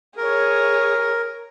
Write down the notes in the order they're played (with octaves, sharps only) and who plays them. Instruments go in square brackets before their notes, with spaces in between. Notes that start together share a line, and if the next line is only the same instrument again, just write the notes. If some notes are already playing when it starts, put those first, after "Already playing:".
[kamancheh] G#4 C#5 [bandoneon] A#4